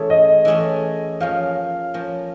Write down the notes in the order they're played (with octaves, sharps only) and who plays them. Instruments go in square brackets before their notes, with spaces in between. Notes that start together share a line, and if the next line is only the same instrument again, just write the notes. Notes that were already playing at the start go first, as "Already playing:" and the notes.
Already playing: [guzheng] E3 A3 C#4 E4 G#4
[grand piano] D#5
[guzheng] E3 A3 C#4 E4 G#4
[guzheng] F3 A#3 C#4 [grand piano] F5
[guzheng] F3 A#3 C#4